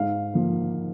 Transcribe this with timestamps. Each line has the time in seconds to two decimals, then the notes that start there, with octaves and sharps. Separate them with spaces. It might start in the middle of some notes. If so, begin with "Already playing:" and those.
Already playing: G#2 F5
0.34 F3 A#3